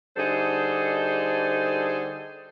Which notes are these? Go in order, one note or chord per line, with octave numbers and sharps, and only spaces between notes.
D3 G3 D#4 G#4 A4 C5